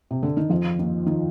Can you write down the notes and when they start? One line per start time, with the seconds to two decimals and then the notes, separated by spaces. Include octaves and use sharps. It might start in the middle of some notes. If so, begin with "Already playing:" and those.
0.11 C3
0.23 D3
0.37 D#3
0.49 F2 F3
0.79 D#2 D#3
1.06 D#3